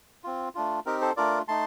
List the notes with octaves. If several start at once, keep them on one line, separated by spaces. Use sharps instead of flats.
C4 F4
A3 D4 F4
C4 D#4 G4 A#4
A4 C5
A3 D4 F4 A#4 D5
A3 D#4 A5 C6